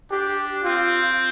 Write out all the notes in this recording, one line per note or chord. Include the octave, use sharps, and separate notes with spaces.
D4 G4
C4 F4